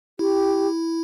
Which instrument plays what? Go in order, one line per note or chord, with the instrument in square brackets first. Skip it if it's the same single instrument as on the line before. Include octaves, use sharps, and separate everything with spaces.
[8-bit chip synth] E4 [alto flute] G4